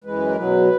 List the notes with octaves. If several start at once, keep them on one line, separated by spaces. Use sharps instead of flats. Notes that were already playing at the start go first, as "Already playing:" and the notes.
F#2 E3 G#3 B4
A#4
B2 F#3 B4